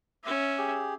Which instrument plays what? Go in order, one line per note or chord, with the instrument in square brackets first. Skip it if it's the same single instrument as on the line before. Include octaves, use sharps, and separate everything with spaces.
[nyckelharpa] C#4 E5
[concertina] G4 G#4